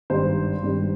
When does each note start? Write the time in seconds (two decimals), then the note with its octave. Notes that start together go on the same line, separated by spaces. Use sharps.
0.10 G#1 G2 G3 C5
0.63 G#1 G2 G3